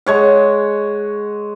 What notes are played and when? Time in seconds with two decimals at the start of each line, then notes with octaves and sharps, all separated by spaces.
0.06 G#3 C#5 F#5